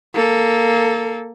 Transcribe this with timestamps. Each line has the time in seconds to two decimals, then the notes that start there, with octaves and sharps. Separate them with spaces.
0.14 A#3 A4